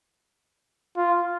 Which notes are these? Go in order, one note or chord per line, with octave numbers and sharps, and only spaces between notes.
F4